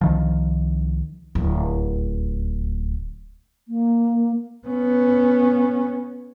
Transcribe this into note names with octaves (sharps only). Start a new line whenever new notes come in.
C2 D#3 F3
D1 C#2
A#3
B3 C#4